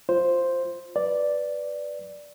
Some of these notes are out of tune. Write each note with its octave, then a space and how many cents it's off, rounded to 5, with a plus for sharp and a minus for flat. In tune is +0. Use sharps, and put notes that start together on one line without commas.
F4 +0 C5 +0
B4 +0 D5 +0